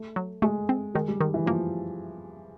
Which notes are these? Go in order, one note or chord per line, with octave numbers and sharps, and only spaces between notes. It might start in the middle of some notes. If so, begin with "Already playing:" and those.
Already playing: A3
F#3
G#3 A3
C4
D#3 G#3
G3
D#3
E3
F3 A#3